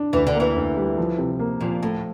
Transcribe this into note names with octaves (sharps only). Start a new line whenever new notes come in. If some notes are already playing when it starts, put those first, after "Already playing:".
Already playing: D4
D2 E3
D3
A#3
E3
D2
G3
F3
C3
A#3
A#2 F3
A2 A3